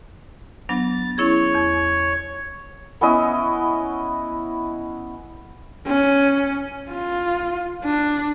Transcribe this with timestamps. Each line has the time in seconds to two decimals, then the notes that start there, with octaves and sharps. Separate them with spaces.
0.69 F#3 B3 D4 A6
1.18 C#4 E4 G#4 C#5
1.55 E2
3.01 B3 C#4 E4 D#5
5.87 C#4
6.91 F4
7.84 D4